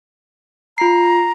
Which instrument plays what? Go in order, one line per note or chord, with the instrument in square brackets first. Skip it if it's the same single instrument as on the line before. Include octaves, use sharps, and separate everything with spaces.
[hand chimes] F4 C7 [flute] A#5